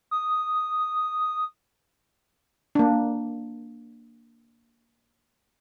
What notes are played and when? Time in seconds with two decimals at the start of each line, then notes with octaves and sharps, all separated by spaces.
0.11 D#6
2.75 A#3 D4